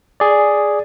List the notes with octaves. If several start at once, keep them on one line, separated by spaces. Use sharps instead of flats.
G#4 D5